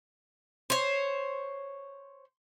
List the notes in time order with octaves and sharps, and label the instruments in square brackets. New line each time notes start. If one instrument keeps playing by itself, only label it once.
[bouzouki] C5 C#5